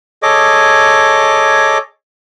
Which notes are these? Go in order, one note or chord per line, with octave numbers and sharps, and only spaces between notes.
G#4 A4 C#5 D#5 D6